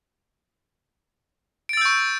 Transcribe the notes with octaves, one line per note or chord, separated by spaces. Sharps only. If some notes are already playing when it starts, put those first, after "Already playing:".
C#6 E6 G6 A6 D7